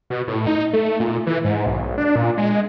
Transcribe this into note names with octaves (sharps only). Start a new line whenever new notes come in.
B2
A2
D#4
A3
A#2
E3
G#2
B1
D4
A#2
G#3